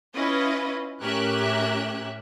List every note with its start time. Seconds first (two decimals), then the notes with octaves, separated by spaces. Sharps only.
0.14 C#4 E4 F4 B4 D#5
1.01 A2 C#4 G4 A#4 E5 F#6